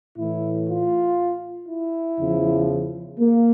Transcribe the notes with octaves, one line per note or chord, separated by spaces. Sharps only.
A2 E3 E4
F4
E4
E2 C#3 F3
A#3